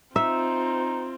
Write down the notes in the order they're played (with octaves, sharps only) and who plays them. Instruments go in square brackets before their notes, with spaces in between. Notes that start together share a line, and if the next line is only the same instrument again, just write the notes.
[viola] C4 F4 [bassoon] D#4 [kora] E5